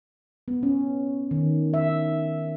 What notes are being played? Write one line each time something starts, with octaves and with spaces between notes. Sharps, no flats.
B3
C#4
D#3
E5